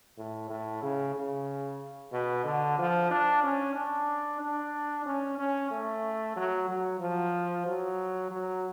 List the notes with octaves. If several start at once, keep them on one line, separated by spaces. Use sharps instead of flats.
A2
A2
C#3
C#3
B2
D3
F3
D4
C#4
D4
D4
C#4
C#4
A3
F#3
F#3
F3
F#3
F#3